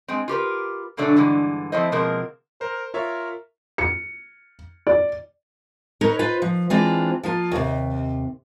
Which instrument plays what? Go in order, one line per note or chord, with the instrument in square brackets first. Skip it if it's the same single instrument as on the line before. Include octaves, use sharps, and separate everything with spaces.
[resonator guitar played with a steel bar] G#3 C4
F4 G4 A#4 B4
F#2 B2 D3 F#3 A3 D4
G2 D3 E3 G#3
F3 A3 C4 E4 C5 D#5
B2 F3 G#3 A#3 C4 A#4
[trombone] A#4 [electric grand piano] C5
[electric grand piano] F4 C#5 E5 [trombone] A#4
[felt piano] C#7
D5
[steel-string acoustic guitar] D#4 A#4 B4 C#5
F4 B4 C5
F3
E3 G#3 C4 D4 F4
F3 A#3 F4
D#2 C3